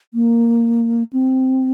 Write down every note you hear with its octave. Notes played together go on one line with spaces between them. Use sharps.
A#3
C4